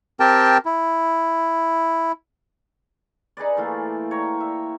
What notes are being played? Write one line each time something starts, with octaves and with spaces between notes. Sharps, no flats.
C4 G4 A#4 G5 A5
E4
D#4 G#4 B4 D5
E3 A3 A#3 F4
C#5 G5 A#5
E5